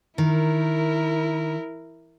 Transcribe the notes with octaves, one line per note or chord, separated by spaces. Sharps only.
D#3 E4 A#4